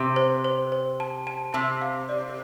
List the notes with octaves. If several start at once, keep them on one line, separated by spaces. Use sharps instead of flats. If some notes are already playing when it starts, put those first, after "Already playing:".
Already playing: C3
C5
C5
C5
A5
A5
C3 A5
F5
D5